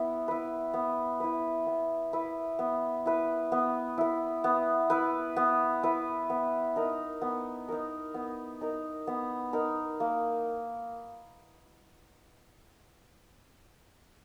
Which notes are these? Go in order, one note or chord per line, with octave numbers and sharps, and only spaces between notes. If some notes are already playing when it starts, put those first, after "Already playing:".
Already playing: B3 E4
E4 B4
B3
E4 B4
B3
E4 B4
B3
E4 B4
B3
E4 B4
B3
E4 B4
B3
E4 B4
B3
D#4 A#4
B3
D#4 A#4
B3
D#4 A#4
B3
D#4 A#4
A#3